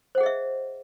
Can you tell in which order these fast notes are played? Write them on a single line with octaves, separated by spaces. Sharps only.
C5 F#5 G#4 D#5 E5